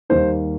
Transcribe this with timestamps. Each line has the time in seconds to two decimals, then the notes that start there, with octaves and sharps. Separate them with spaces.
0.09 D#2 D#3 G3 A#3 D#4 C5